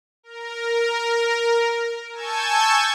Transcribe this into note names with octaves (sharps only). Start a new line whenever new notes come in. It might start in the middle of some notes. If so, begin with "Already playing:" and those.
A#4
G#5 A5 C#6 E6 G6 G#6